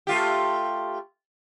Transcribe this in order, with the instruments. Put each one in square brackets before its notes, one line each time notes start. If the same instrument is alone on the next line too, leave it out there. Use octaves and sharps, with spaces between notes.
[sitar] A3 F4 G4